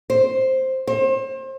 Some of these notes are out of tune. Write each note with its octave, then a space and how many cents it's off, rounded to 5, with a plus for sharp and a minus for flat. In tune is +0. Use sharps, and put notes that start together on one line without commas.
C5 +5
C5 +35